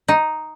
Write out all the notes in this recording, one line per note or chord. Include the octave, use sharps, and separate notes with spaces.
D#4